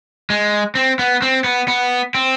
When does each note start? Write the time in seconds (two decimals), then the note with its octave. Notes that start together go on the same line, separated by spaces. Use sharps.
0.30 G#3
0.75 C4
0.99 B3
1.22 C4
1.44 B3
1.68 B3
2.15 C4